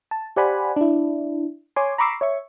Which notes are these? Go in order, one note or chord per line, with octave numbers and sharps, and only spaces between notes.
A5
G4 C5 D5 F#5 G#5 B5
D4 E4
C#5 G#5 C6 D6
A#5 B5 C#6 D6 E6 C7
C#5 E5 C#6